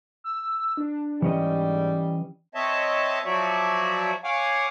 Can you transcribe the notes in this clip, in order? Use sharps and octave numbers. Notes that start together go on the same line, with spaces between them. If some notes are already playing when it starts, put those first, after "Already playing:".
E6
D4
G#2 E3 G3 C#4 D#5
C4 C#5 D#5 E5 A5
F3 F#3 F#4 C#5 D5 E5
C#5 F5 F#5 G#5 D6